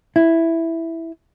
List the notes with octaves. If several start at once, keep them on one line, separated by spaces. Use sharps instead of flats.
E4